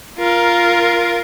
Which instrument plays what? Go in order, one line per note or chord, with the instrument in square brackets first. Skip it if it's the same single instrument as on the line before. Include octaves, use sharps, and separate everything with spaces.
[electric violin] F4 A#4